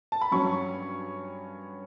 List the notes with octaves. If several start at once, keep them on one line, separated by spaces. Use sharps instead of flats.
A5
B5
G2 F#3 C#4 C#6